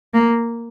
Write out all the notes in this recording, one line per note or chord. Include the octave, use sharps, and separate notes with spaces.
A#3